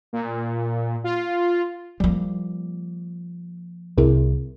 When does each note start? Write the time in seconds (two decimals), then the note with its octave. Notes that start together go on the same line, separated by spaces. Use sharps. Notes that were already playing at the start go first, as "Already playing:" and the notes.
0.13 A#2
1.04 F4
2.00 F3 G3 A#3
3.98 C2 C3 E4 G#4 A#4